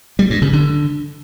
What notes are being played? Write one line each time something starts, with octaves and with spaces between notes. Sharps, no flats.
G3
G2
C#3
D3